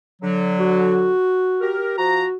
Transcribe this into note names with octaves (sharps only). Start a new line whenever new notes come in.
D3 F#3
F#4
G4 A#4
F3 F#4 A#5